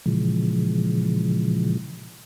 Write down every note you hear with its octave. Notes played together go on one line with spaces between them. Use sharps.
A#2 C#3 E3 F3 G#3